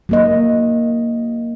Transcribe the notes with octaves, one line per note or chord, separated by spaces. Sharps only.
F#3 A#3 D#5